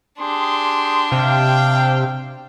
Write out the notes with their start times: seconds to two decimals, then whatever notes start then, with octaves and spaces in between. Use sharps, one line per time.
0.19 D4 G4 G#4 C6
1.12 C3 F5 G5